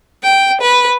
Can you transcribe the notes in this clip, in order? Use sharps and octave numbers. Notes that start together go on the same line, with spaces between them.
G5
B4